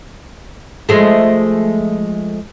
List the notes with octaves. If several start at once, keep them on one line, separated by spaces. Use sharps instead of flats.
F3 G#3 A3